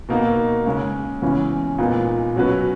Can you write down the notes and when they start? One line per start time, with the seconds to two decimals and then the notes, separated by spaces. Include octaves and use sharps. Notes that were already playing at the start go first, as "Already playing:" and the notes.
0.09 B2 A#3 D#4 F#4 A#4
0.66 C#3 G#3 C#4
1.22 E2 C#3 E3 G#3 C#4
1.78 A#2 G#3 B3 D#4
2.36 B2 F#3 C#4 F#4 B4